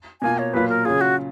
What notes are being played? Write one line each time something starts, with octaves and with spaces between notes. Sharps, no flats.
B2 A#3 F4 G#5
C#5
A#2 F#3 A#3 F4 B4
A#4
C#3 F#3 C#4 F4 G#4
F#4